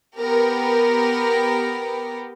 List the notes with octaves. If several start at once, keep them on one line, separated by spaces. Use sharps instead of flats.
B3 G4 A#4